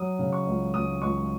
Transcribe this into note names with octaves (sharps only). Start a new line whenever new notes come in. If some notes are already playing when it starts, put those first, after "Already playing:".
Already playing: F#3 D#6
C#3
C#6
C#2
C#2 D#6
C#2 C#6